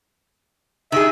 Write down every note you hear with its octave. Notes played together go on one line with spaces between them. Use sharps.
D#3 G#4 E5